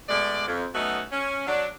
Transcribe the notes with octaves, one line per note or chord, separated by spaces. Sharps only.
B2 G#3 A3 D5
F2
F#3 A3 B3 C#4 D#4 F#4
C#4
F#3 D4